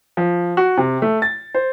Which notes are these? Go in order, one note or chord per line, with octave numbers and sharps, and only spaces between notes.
F3
F#4
C3
A3
A6
C5